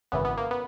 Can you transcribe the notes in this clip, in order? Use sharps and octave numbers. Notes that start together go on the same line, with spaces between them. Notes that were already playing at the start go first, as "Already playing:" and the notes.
G#1 F#2 C#3 E3 B3
B3
A#3
B3